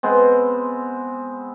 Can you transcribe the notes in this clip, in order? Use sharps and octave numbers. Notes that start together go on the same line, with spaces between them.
G#3 B3 C4